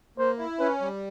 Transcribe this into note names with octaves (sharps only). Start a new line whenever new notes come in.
A#3 C5
E4
C#4 B4
G3